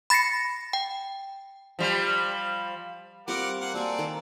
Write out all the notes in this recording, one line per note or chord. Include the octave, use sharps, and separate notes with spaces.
B5 A6 A#6 C7 C#7
G5
F3 G3
G3 C4 F4 A#4 F#5 D6
A#3 F#5
A#3 C4 F#4 A4 D5 G#5
D#3 A#4 C5